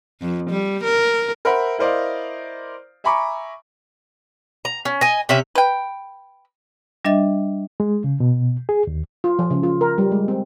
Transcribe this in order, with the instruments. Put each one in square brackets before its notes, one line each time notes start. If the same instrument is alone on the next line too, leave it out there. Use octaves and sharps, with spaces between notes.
[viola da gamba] F2
G3
A#4
[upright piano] A#4 C5 E5 F#5 B5
E4 A#4 C5 D5 D#5 F5
E5 G#5 A#5 B5 C#6 D6
[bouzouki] A#5
C#4
D#5 G#5
C3 C#4 E5
[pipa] B4 G5
[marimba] G3 D4 D#5 E5 A6
[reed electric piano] G#3
C#3
B2
G#4
D#2
[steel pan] F4
F3
C#3
F4
A#4
G3
G#3
C4